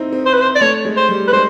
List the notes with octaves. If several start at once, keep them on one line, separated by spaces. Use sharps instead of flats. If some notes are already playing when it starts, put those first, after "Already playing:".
Already playing: C4 D#4 E4
C4
C5
B4
C5
D5
A3 C#5
G#3
C5
G3
B4
G#3 C5